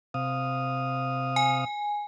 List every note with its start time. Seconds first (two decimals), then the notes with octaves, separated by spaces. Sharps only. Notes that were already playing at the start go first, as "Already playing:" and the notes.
0.14 C3 F5 D#6
1.36 G#5